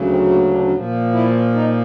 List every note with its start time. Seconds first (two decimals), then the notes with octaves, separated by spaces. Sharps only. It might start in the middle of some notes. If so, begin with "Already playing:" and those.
Already playing: D2 C#3 F#3
0.10 C4
0.30 A#3
0.51 D4
0.72 A#2 F3
1.13 E4
1.54 D#4